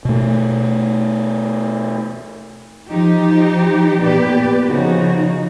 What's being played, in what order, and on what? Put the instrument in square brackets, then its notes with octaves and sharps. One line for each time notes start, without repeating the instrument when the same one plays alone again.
[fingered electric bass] B2 A3
[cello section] F3 D#4 G4
A#2 B3 G4 B4 D5
C#3 F3 D#4 F#4